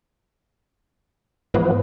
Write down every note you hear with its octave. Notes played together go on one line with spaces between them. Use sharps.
G#2 E3 F3 B3